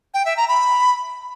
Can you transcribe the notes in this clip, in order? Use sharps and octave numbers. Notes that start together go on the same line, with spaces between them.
G5
E5
A#5
B5